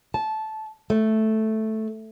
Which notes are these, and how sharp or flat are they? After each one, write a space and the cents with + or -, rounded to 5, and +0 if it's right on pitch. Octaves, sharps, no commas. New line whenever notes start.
A5 -15
A3 -5